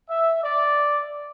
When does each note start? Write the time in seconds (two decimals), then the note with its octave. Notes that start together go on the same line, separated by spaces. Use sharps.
0.10 E5
0.43 D5